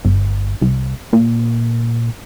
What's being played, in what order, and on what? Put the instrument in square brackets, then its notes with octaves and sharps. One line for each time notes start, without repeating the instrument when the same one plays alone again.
[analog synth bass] G1
C2
A#2